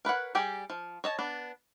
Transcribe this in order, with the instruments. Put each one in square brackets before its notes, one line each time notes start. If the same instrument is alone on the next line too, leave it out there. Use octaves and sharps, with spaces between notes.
[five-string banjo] A#4 B4 C#5 F#5
G3 G4 G#4 G5
F3
C#5 D#5 A5
B3 D4